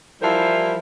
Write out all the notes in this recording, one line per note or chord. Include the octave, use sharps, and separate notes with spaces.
E3 F3 G3 E4 A#4 C5